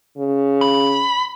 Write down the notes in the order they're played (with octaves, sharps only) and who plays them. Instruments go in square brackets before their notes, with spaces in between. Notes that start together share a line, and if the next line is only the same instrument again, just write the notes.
[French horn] C#3
[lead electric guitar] B5